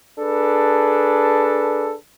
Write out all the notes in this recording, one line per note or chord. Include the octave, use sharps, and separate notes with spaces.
D4 G#4 A4 B4